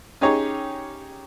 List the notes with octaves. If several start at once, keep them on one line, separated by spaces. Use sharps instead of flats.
C#4 D#4 G4 G#4 C#5 A#5